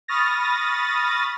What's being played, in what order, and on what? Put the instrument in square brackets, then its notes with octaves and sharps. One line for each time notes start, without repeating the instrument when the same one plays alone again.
[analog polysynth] B5 C#6 D#6 F6 A6 A#6